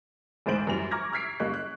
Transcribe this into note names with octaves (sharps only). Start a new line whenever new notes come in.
A1 D2 G#2 C5 D7 F#7
F#2 E3 G3 F7
A#5 C#6 D6 F6 G#6 A#6
E6 F6 G#6 B6 C7 D7
F#1 G3 A#3 D#5 C#6 F#6
F#6